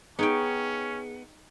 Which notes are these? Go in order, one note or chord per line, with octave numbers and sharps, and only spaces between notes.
B3 C#4 D#4 G#4 C#5 G5